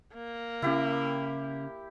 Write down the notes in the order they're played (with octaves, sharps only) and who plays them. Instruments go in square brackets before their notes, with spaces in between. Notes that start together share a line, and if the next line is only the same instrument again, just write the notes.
[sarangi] A#3
[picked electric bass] C#3 C#4 [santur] E4 G4